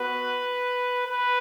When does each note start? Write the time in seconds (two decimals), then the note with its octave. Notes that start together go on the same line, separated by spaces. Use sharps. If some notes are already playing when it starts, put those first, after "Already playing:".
Already playing: B3 F#4 B4
1.06 B4